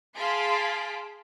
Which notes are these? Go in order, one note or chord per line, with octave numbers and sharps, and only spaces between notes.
G#4 F5 A5 C6 B6 D7